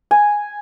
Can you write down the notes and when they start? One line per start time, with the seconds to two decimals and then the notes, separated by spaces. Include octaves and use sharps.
0.11 G#5